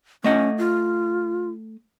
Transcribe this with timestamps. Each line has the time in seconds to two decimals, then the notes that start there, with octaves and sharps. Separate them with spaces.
0.24 A3 C#4 D#5 F#5
0.58 F4